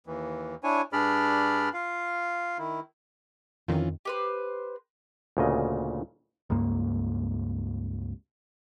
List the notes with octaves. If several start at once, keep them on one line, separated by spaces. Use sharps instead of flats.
D#2 E3
D4 E4 C#5 G#5
G2 D4 G#4 D5 B5 F6
F4 F5
D#3 E4
F2 D#3 E3 C#4 F4
G4 B4 C5
D2 A#2 C#3 D#5
C#2 G2 A#3